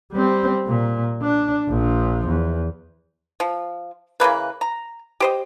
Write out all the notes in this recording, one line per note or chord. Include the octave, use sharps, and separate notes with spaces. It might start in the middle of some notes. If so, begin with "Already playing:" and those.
G3 C4
A#2
D4
A#1 F3
E2
F3
C#3 E3 A#3 B4
A#5
G4 C5 D#5